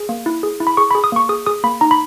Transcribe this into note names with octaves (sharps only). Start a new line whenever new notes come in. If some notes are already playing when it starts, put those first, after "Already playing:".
Already playing: G#4
A#3
E4
G#4
E4
B5
G#4 C#6
B5
G#4
D#6
A#3 C#6
G#4 D#6
G#4 D#6
A#3 B5
D#4 A#5
B5